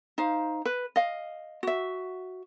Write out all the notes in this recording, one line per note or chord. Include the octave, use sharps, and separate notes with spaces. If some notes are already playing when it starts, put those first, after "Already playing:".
D#4 C5 F5
B4
D#5 F5
F#4 E5